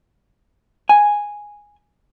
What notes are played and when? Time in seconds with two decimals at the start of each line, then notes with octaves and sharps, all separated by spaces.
0.89 G#5